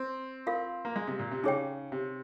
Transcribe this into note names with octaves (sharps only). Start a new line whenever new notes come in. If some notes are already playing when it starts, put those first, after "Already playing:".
Already playing: C4
F4 A#4 F5
A#3
G#3
C3
A#2
C3
C#3 D#4 G#4 C#5 G5
C3